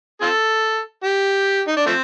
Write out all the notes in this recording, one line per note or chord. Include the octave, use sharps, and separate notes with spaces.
C4 F4 A4
G4
D#4
D4
F3 A3 C4